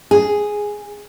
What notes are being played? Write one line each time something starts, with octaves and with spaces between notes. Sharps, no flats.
G#4